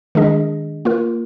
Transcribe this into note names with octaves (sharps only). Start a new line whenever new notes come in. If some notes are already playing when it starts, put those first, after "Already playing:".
D#3 G#3 D4 G#4 D#5
A#3 F4 A#4